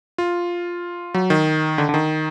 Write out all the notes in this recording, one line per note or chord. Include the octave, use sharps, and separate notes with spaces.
F4
F#3
D#3
D3
D3
D#3